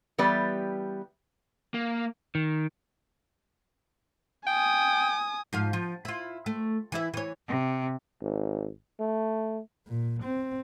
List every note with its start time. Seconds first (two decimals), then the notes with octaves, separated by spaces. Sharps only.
0.18 E3 G3 B3 G4 B4 D5
1.74 A#3
2.35 D#3
4.47 G5 G#5 D#6
5.53 G#2 F3 F5
5.73 F3
6.05 E4 F4
6.46 A3
6.92 E3 E4 E5
7.14 E3 C#5
7.48 C3
8.21 G#1
9.00 A3
9.88 A#2
10.23 C4